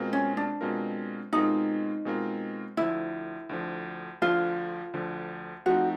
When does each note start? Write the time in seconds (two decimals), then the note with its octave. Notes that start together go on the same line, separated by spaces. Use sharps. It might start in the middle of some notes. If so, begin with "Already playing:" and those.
Already playing: B2 G#3 C4 F4 A#4
0.13 C#4
0.37 D4
0.61 B2 G#3 C4 F4 A#4
1.32 B2 G#3 C4 D#4 F4 A#4
2.05 B2 G#3 C4 F4 A#4
2.77 D2 D3 F3 E4
3.49 D2 D3 F3
4.22 D2 D3 F3 F4
4.93 D2 D3 F3
5.66 F3 A3 C4 D#4 F#4